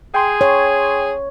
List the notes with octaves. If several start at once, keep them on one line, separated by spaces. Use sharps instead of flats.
G#4 G5 C6
C#5